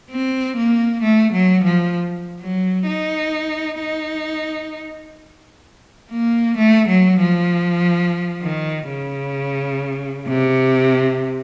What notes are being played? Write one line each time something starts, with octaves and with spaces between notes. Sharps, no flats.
C4
A#3
A3
F#3
F3
F#3
D#4
D#4
A#3
A3
F#3
F3
D#3
C#3
C3